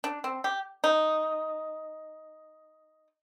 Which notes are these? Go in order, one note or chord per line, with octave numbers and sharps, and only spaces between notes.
D4
C4
G4
D#4